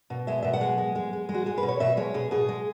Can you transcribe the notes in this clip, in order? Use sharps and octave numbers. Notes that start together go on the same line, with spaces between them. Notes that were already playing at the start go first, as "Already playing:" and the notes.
B2
G#3 E5
B2 E5
F#5
G#3
G#3
G#3
G#3
G#3
F#4
G#3 G#4
B4
B2
C#5
B2 E5
G#3 C#5
B2 G#4
B2 G#4
G#3